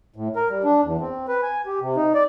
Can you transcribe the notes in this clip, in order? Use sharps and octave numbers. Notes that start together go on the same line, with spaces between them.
A2
A#4
G3
D4
E2
C4
B4
G#5
G4
C3
D#4
D5